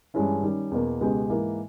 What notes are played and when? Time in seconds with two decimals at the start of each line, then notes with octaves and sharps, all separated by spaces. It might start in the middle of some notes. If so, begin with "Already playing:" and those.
0.14 G2 E3 G#3 C#4 E4
0.43 D#3 G3 C#4
0.72 E2 B2 A#3
1.01 C#2 B2 G#3 B3 G4
1.30 G#2 E3 A#3